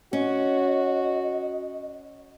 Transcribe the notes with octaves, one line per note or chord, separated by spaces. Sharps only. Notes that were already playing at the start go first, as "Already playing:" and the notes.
C#4 F#4 D#5